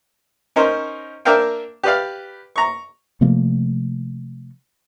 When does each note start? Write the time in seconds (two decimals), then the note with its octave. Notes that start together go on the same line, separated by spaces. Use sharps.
0.56 C#4 D#4 A#4 C5
1.25 A#3 D4 A#4 E5 F5 G5
1.83 G4 B4 D5 F5
2.56 A#5 C#6
3.21 C3 F3 A3 A#3